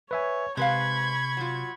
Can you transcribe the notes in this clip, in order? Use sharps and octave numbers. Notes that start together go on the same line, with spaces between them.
B4 C#5 E5 G#5
C3 G#3 B4 F5 B5 C#6 G#6
F#3 F4